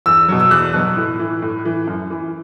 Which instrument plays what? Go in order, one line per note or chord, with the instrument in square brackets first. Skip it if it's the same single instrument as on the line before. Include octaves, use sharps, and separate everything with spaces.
[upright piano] E2 E6
B2 F#3
E6
E2 F#6
B2 F#3
A2
E3
A2
E3
F#2
E3